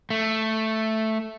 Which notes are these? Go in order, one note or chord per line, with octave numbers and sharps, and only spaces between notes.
A3